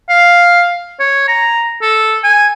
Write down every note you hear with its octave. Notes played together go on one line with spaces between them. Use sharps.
F5
C#5
A#5
A4
G#5